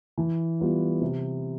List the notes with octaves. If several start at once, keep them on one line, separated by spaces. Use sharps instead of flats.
E3
G3 B3 F4
C3